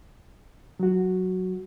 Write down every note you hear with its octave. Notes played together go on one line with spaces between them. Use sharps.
F#3 F#4